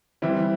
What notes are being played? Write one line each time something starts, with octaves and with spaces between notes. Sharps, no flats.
E3 G3 C4 E4